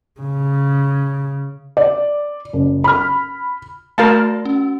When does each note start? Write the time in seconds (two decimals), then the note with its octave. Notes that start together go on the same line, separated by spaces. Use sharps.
0.21 C#3
1.77 D5
2.53 F#1
2.84 B5 F6
3.98 A3 F#4 A#4 F5 A5
4.45 C#4